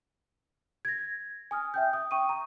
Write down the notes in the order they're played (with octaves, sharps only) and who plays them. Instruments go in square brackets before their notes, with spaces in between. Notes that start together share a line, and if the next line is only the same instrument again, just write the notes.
[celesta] G#6 A#6
G#5 D#6 F6
E5 G5 G6
D#6
G5 C#6 D#6 D#7
A#5